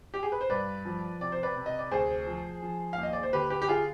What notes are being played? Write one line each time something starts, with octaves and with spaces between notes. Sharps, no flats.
G4
G#4
B4
C5
G2 B4 D5
F3
C3 D5
C5
B4 D5
C3
D#5
D5
D2 G#4 C5
F3
F3
D#2 F5
D#5
D5
C5
D3 G4 B4
G4 B4
G4
F4 G#4